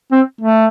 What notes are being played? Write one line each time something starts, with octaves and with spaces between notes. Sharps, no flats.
C4
A3